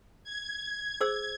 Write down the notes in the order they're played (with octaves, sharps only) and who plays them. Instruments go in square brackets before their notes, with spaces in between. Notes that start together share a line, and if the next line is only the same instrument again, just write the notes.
[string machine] G#6
[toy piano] G#4 C5 E6